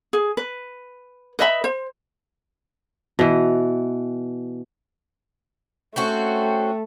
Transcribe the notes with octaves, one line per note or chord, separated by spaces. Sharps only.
G#4
B4
B4 D#5 E5 B5
C5
B2 E3
A3 C4 C#4 F#4